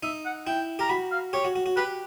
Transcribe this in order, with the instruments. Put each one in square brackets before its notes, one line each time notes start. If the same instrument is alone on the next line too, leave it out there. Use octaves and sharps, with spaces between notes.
[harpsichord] D#4 [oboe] E5
[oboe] F#5
[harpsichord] E4 [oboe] G5
[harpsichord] G4 [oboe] A#5
[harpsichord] F#4 [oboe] B5
[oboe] F5
[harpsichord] G4 [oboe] C#5
[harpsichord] F#4
F#4
F#4
[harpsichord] G4 [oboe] B4